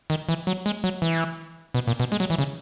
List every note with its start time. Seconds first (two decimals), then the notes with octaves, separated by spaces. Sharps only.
0.10 D#3
0.29 E3
0.47 F#3
0.66 G#3
0.84 F#3
1.02 E3
1.75 B2
1.87 A#2
2.00 B2
2.12 G#3
2.20 F#3
2.30 E3
2.39 C#3